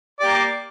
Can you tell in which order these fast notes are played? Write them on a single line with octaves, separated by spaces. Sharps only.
D5 G4 A#3